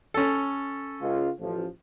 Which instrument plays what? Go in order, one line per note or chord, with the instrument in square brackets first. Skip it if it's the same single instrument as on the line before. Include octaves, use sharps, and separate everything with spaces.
[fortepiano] C#4 A4
[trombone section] C#2 F4
A1 F3